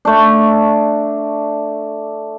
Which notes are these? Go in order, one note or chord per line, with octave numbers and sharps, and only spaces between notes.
A3 D4